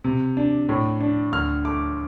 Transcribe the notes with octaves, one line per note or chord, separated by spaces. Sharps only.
C3
D4
A2
D4
D2 F6
A3 D6